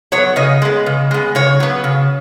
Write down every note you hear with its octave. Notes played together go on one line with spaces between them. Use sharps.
F#3 B3 C#5
C#3 D#5
G#3 B3
C#3
G#3 B3
C#3 C#5
F#3 B3
C#3